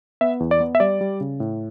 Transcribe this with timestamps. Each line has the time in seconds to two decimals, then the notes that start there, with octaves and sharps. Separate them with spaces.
0.21 B3 E5
0.40 E2
0.51 D5
0.60 B3
0.75 E5
0.80 G3 D5
1.01 G3
1.21 C#3
1.40 A2